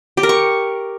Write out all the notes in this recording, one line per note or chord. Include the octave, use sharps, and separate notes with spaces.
G4
A#4
C#6